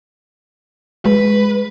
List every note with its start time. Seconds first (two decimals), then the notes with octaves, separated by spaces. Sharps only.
1.05 G#3 B4